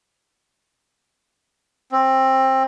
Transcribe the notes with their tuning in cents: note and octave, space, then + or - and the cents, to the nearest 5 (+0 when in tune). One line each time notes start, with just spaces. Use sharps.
C4 +20